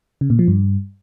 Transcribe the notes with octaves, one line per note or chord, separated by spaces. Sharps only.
C#3
A#2
F3
G2